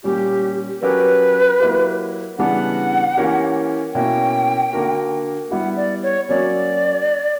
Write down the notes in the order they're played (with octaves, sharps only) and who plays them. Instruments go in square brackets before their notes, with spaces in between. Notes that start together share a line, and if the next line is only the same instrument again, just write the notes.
[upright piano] A#2 G3 C#4 [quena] G4
[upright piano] F#3 C#4 G4 A#4 [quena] B4
[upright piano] F#3 A#3 E4 G4
[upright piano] C#3 E3 G3 B3 D4 [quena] F#5
[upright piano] E3 A#3 C#4 G4 A#4
[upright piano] B2 A#3 C#4 E4 [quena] G5
[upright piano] D3 A#3 D4 F#4 A#4
[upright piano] G3 B3 E4 G4 [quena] F#5
[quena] D5
C#5
[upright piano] F#3 A#3 C#4 F#4 [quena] D5